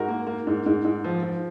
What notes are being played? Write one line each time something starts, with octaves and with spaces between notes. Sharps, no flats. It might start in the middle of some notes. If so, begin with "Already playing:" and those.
Already playing: G#2 F#4 A#4
A#3
A#3
G#2
G#2
G#2
F3
F3